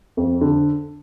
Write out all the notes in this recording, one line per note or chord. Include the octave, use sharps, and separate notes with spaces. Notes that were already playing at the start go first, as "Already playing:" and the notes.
F2
D3